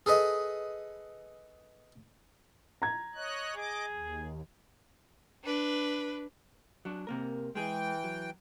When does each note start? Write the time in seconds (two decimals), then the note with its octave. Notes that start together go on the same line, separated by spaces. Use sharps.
0.06 G#4 A4 B4 D#5
2.82 A#5 G#6
3.15 C#5 D#5 F#6
3.56 G#4 D#5 D6
3.92 D#2
5.44 D4 B4
6.85 F#3 D4
7.07 C3 A#3 A#4
7.55 E3 G#3 G#4 G5
8.04 F#3